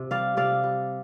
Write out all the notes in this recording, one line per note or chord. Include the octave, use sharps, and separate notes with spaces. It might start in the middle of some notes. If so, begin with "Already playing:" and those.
Already playing: C3
G3 D5 F5
C3 D5 F5
G3